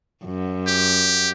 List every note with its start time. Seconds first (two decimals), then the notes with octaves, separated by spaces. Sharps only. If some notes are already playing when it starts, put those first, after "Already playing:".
0.24 F#2
0.67 G4